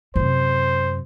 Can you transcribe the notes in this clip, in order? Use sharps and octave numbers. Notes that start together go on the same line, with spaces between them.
F#2 C3 C5